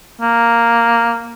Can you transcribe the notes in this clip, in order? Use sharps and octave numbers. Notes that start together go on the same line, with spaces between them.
A#3